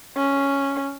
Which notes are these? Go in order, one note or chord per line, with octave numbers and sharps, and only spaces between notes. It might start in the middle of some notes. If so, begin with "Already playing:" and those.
C#4